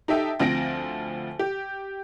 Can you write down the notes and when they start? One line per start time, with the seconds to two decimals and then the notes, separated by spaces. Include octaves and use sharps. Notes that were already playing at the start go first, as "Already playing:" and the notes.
0.08 D#4 G4 A4 E5 G5
0.39 D2 F3 C4 A#6 D7
1.39 G4